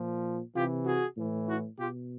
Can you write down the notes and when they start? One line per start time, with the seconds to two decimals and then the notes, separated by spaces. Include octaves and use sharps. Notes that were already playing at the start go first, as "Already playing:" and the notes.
Already playing: A#2 F3
0.54 C3 E3 F4 G4
0.85 F#4 G#4
1.17 A2 E3
1.47 E4 F#4
1.78 B2 F4 G4